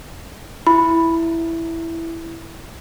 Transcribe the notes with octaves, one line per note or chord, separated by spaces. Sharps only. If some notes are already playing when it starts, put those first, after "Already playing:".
E4 B5